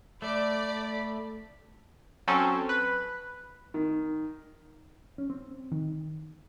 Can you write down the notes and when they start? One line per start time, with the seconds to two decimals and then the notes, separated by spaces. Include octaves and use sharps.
0.22 A3 D5 B5
2.27 F#3 C4 C#4 A4
2.69 B4
3.74 D#3
5.18 C#4
5.30 C4
5.72 D#3